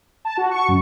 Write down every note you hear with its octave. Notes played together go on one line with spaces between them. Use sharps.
A5
F#4
C#6
F#2